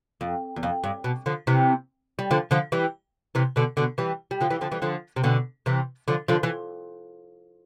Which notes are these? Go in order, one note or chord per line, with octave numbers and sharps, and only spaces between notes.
F2
E2
F2
G2
B2
D3 F3
C3 E3
G3
D3 F3
D3 F3
E3 G3
C3 E3
B2 D3
B2 D3
E3 G3
G3
D3 F3
E3 G3
D3 F3
E3 G3
D3 F3
C3
B2 D3
C3 E3
D3 F3
D3 F3
E3